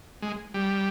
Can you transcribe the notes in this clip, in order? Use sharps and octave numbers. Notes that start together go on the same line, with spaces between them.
G#3
G3